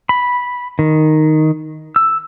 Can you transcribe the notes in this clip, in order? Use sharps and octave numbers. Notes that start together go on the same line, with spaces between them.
B5
D#3
E6